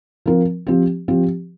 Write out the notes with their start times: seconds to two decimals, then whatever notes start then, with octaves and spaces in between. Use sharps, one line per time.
0.26 F3 C4 A#4
0.67 F3 C4 G4
1.08 F3 C4 G4